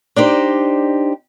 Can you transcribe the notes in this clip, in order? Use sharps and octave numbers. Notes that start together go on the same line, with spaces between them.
D4 D#4 G4 C5